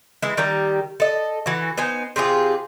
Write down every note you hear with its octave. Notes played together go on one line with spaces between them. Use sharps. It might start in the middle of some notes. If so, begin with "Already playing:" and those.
E3 G#3 E4
D#3 G3 G4 A#5
A4 D#5
E3 F#4
B3 D#4 C5 G#5
C3 F4 G4 G#4